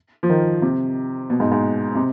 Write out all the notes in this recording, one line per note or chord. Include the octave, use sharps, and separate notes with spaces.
F3
D#3
C3
B2
G#2
G#2
C3